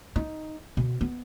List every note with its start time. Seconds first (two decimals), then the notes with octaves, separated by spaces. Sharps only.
0.16 D#4
0.77 B2
1.01 B3